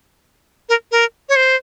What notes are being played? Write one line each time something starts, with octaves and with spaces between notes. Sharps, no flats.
A#4
A#4
C#5
C5